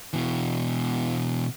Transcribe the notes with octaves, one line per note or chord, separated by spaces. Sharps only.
B2 E3